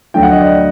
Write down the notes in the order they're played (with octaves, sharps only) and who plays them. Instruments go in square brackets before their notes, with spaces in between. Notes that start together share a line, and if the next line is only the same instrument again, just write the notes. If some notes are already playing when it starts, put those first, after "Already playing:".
[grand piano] D2 D3 F#3 A3 G5
F#5
D#5
D5